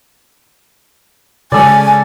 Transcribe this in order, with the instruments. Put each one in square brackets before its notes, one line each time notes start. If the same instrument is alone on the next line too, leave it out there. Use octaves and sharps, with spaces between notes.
[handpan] C#3 G#3 [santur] A4 D5 [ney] G#5